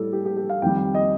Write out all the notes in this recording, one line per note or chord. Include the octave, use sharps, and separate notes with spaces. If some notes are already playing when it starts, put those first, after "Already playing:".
Already playing: A2 G3 A4
G4
G4
G4
F5
F2 D#3 G3 G5
G5
D#5